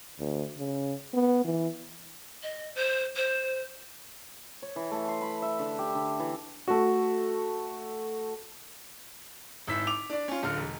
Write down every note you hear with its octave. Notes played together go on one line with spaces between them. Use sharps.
D2
C#3
B3
E3
D#5
C5
C5
C#5
E3
A3
C6
B5
E5
D3
G4
D3
E3
A3 F#4
G#1 E4 E6 B6
D6 F7
D4 D5
C#4 F4
D1 D3 F4 F6
E1